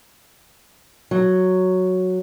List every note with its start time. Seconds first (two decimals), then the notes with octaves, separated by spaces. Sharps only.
1.11 F#3